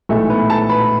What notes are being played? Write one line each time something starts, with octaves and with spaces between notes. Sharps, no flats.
B1 A2 E3 G#3 A3 A4
B3 B4
A4 A5
B4 B5